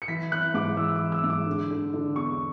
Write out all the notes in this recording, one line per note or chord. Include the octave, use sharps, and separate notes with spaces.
C#7
E3 B6
E3 F#6
G#2 D6
E3 E6
D6
E3
E6
G#2
D6
D3
D3
D3
E2 C#6